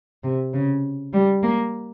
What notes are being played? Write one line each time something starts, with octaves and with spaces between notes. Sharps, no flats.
C3
C#3
G3
A#3